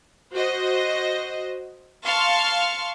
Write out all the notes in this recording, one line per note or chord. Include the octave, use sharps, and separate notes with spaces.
F#4 C5 D#5
F5 A5 C6 C#6 F6